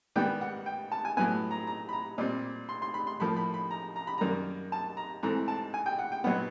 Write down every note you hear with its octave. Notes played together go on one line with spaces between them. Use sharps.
G#2 D#3 G3 B3 G5
F#5
G5
A5
G#5
A2 F#3 B3 G#5
A#5
A#5
B5
A#5
A#2 G3 C4
C6
C6
B5
C6
A2 F3 A#3 B5
B5
B5
A#5
A#5
B5
F#2 D#3 G3 A#3 A#5
A5
A#5
G#2 E3 A3 C4 A#5
A5
G#5
G5
F#5
G5
A#2 F#3 B3 F#5